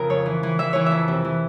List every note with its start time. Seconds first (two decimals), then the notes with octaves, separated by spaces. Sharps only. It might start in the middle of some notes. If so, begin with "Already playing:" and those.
Already playing: F2 C#3 A#4
0.09 F3 C#5
0.26 E3
0.43 E3
0.59 E3 E5
0.73 E3 C#5
0.86 E5
0.91 F2
1.08 C3
1.25 E3